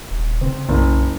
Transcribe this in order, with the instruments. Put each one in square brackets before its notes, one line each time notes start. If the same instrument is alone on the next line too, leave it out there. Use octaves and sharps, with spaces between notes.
[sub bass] D#1
[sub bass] C#3 [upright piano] C4
[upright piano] F#1 [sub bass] B1